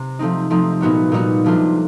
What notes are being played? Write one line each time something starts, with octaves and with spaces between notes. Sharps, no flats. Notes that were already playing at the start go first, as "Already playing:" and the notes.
Already playing: C3 G4
F3 A3 C4 D#4
F3 A3 C4 D#4
A#2 G3 B3 D#4 F#4
A#2 G3 B3 D#4 F#4
C3 F3 A3 D4 F4